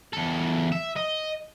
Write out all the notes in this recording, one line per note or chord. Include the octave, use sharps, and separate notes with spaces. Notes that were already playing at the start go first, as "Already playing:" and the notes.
E2 A4
E5
D#5